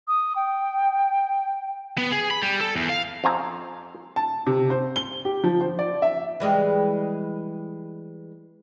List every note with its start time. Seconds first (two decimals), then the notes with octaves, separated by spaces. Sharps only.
0.08 D#6
0.36 G5
1.98 B3
2.12 G#4
2.31 B5
2.43 G3
2.61 A4
2.76 E2
2.89 F5
3.24 F2 C4 F4 G#5 A#5
4.16 A5
4.47 C3
4.70 C5
4.96 G7
5.25 G4
5.44 F3
5.61 C5
5.79 D5
6.02 E5
6.40 E3 G3 G#3